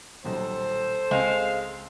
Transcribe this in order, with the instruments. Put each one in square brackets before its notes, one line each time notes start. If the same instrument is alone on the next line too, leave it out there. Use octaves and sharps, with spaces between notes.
[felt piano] D#1 B1 [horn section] A4 C5
[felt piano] C#2 C4 [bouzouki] G#3 [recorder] F5